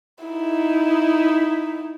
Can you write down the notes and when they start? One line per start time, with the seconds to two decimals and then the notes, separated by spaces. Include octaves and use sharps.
0.24 D#4 E4